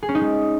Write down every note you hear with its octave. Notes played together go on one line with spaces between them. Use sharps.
G#4
C#4
D#4
G#3